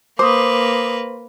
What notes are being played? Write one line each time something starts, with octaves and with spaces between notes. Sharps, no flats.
A#3 B4 C5 D6 D#6